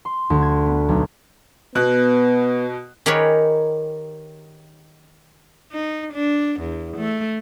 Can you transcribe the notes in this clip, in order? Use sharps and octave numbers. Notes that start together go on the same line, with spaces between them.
C6
D2
G#6
B3
B1
B2 B3 F#6
D#3 G4 G#4 A#4 B4 C#5
D#4
D4
E2
A3